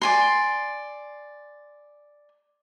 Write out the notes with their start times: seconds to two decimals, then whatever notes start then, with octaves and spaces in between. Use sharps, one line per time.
0.02 D5 G#5 C6